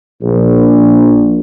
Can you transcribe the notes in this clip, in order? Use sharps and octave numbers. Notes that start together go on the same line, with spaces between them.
A#1